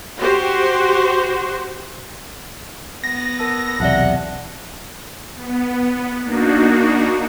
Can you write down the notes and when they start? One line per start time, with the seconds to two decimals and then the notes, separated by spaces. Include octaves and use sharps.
0.20 F#4 G4 C5
3.04 B3 A#6
3.39 A#4 A5 E6
3.80 B1 E2 C3 D5 E5 F#5 A5
5.35 B3
6.22 A#3 D4 D#4 F#4